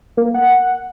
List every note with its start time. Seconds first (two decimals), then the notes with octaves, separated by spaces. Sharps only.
0.17 A#3
0.34 F#5